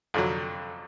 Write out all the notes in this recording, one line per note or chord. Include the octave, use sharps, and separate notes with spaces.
F2 D3 F#3